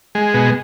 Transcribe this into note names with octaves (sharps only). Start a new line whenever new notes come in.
G#3
B2